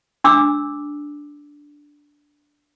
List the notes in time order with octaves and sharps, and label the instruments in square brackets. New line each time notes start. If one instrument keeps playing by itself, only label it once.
[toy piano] D4 D6 E6